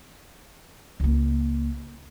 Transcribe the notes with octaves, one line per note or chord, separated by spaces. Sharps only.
C#2 A#3